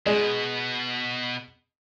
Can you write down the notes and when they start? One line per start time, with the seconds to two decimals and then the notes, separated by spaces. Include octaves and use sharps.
0.06 B2 G#3